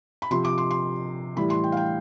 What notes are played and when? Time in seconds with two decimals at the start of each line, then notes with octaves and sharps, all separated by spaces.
0.22 B5
0.31 C3 F3 C6
0.45 D6
0.58 C6
0.71 C6
1.37 A2 E3 G3 B5
1.50 C6
1.64 G5
1.72 F5
1.77 G5